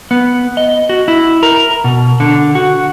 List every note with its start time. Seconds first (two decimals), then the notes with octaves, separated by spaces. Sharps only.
0.11 B3
0.57 D#5
0.89 F#4
1.08 E4
1.43 A#4
1.84 B2
2.20 D3
2.55 F#4